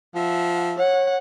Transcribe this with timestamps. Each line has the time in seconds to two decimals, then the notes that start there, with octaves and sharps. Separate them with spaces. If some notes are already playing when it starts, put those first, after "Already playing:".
0.15 F3 E5 F#5
0.77 C#5 F#5